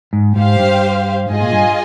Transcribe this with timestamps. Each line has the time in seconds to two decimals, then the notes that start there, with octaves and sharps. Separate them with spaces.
0.13 G#2
0.36 G#2 G4 C5 F5
0.59 G2
1.30 G#2 F4 G#4 D#5 G#5
1.41 A#2
1.52 G2